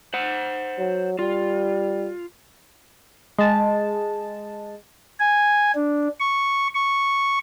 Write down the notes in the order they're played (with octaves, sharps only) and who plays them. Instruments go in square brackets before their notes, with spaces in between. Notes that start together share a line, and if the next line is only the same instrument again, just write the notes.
[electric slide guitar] C5 F#5
[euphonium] F#3
[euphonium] G3 [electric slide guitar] F4
[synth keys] G#3 A5
[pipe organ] G#5
D4
C#6
C#6